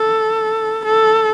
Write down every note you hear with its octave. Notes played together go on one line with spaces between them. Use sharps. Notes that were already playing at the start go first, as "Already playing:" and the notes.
Already playing: A4
A4